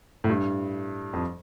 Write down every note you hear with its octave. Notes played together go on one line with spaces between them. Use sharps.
A2
G2
F2